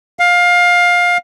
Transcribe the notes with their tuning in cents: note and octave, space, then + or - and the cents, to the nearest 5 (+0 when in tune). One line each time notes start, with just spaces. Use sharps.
F5 +20